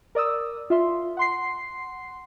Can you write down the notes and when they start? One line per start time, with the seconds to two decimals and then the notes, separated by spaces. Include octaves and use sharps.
0.15 A#4 D5 D#6 E6
0.70 F4 E5 C6
1.17 F#5 C6 C7